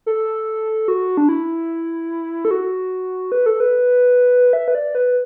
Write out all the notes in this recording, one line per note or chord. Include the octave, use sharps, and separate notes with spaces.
A4
F#4
D4
E4
A4
F#4
B4
A4
B4
E5
B4
D5
B4